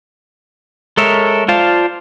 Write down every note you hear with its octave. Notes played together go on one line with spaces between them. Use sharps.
G#3 A4 A#4 C#5 E5
F4 C5 D5 F5 A5